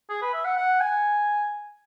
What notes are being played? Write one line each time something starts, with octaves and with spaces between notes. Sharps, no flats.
G#4
B4
E5
F#5
F#5
G#5